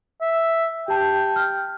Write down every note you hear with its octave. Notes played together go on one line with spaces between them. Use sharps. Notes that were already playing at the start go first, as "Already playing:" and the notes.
E5
G4 G5 A5
F6